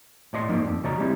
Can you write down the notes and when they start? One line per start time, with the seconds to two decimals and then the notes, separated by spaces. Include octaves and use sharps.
0.33 A2 D5 D#5 C6
0.49 G#2 F3 A#3 D#4 D5
0.65 F2
0.83 C#3 F#4 D5 D#5 A#5
0.98 G3 G#3 C4 E4